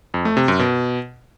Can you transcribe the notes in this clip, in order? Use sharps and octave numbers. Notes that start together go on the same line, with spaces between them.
F2
A3
C3
F#2
B2